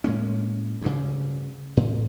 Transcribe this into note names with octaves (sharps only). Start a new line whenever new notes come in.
A2 G#3 A#3 C#4
D2 G2 C#3
A2